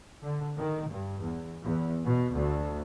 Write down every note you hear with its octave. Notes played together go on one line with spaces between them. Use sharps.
D3
D#3
G2
E2
E2
B2
D2